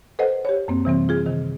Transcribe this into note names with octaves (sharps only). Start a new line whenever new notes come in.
A4 B4 C5 D#5 F#5
G4 C#5
F#2 A#3 C4
C3 E3 G3 C4
F4 G#4
C3 D#3